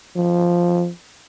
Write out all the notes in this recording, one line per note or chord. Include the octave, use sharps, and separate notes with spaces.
F3